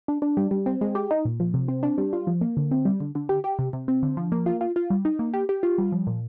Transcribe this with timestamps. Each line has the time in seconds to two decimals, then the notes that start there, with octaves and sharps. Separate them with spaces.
0.08 D4
0.22 D4
0.37 G3
0.51 G3
0.66 C4
0.81 G#3
0.95 G4
1.11 D#4
1.25 A#2
1.40 F3
1.54 C3
1.68 C4
1.83 D4
1.98 G3
2.13 F4
2.27 F3
2.41 A#3
2.57 D3
2.71 C4
2.85 G3
3.00 D3
3.15 D3
3.29 G4
3.44 G4
3.59 C3
3.73 C3
3.88 C4
4.03 D3
4.17 F3
4.32 A#3
4.46 F4
4.61 F4
4.76 F4
4.90 G3
5.05 D#4
5.19 A#3
5.34 G4
5.49 G4
5.63 F4
5.78 G3
5.92 F3
6.07 A#2